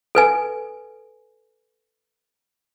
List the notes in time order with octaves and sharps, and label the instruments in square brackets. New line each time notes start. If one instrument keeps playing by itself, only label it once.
[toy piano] A4 B4 G#5